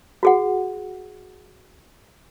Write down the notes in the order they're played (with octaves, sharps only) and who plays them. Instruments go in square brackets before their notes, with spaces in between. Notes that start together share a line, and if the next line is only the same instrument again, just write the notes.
[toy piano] F#4 G#4 F#5